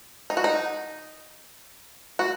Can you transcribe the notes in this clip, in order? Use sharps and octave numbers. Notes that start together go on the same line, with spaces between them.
D#4
F#4
D#4
F#4